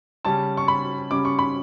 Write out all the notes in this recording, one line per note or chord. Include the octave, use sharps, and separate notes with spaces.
C#3 G3 C#4 A5
C#6
B5
C#3 G3 C#4 D6
C#6
B5